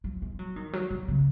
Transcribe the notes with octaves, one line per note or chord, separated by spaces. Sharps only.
F#3
G#3
F#3
D#3
F#3
F#3
C#3